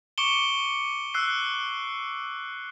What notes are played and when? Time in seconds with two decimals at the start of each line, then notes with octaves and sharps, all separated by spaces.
0.18 C#6 D6 C#7 D7 E7 G7
1.14 E6 F#6 C7